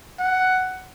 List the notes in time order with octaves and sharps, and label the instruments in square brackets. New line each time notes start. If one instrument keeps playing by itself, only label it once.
[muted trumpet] F#5